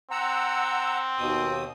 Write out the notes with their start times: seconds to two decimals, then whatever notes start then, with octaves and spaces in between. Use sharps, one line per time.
0.11 C4 F#5 A#5 E6
1.18 D#2 B2 D#6